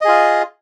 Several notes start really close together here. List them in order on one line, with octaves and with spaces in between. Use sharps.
D#5 G#4 F4